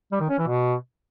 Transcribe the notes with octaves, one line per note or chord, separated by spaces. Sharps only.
G3
D#3
C#4
E3
B2